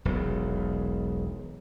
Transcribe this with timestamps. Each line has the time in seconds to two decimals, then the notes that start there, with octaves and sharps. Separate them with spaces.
0.05 E1 B1